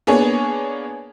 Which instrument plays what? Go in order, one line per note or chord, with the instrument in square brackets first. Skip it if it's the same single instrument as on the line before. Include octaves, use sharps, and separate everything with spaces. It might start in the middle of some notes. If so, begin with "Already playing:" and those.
[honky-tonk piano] A#3 B3 D4 G#4 C#5 G#5